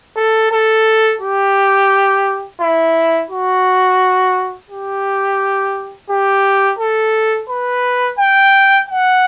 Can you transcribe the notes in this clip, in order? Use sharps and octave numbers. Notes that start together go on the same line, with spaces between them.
A4
A4
G4
E4
F#4
G4
G4
A4
B4
G5
F#5